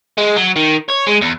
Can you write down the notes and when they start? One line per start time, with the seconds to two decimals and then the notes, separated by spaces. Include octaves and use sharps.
0.18 G#3
0.36 F#3
0.56 D#3
0.89 C#5
1.07 G#3
1.21 E2